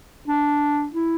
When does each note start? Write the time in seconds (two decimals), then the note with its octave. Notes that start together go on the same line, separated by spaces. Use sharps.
0.28 D4
0.93 E4